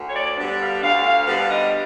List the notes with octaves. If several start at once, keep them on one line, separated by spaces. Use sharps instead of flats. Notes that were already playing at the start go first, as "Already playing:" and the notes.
Already playing: D2
C#5
D5
D3 G3 B3 D4
F5
D2 F5
F5
D3 G3 B3 D4 F5
D#5